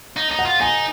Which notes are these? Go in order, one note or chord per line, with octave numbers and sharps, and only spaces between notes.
D#4
D#4
F#5
F4
D#4 G#5